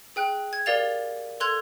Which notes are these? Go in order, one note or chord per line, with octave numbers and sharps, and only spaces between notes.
G#4 G5 F#6
G#6
G4 A#4 D5 F5 A6 F7
A4 C6 F#6 G#6 F7